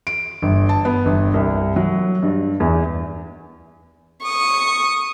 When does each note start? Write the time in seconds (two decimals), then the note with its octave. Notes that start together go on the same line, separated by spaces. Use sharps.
0.07 D7
0.42 G1
0.69 A5
0.85 B3
1.06 G1
1.34 C2
1.76 F#3
2.23 G2
2.60 E2
4.25 C#6 D#6